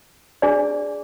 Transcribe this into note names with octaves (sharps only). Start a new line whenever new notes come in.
D4 G#4 D5